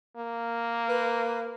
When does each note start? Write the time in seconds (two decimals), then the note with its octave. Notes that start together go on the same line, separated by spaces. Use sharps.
0.17 A#3
0.89 B4